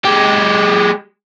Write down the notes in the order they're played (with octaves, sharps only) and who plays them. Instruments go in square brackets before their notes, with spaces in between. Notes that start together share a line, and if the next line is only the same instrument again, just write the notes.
[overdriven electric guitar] G#3 G4